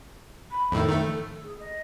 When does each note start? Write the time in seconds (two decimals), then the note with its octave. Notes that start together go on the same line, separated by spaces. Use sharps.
0.51 B5
0.72 F2 A2 D#3 A4
0.88 D#3 A3
1.43 G#4
1.59 D#5